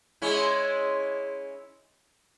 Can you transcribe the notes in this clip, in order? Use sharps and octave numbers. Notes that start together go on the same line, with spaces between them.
G#3 C#4 E4